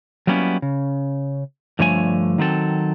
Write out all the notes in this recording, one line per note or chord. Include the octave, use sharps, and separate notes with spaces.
F#3 G3 A#3 B3 C#4 E4
C#3
G2 D3 F3 A3 C#5 G#5
D#3 F#3 C4 A4